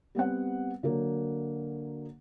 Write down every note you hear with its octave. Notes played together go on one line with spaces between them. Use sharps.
G3 B3 C4 F#5
D3 F#3 A#3